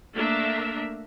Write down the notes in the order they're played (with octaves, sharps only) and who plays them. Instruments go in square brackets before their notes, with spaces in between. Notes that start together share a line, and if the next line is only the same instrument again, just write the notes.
[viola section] A3 A#3 D4 A#4 E5